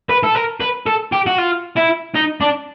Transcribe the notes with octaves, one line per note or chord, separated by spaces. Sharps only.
B4
A4
A#4
B4
A4
G4
F#4
F4
E4
D#4
D4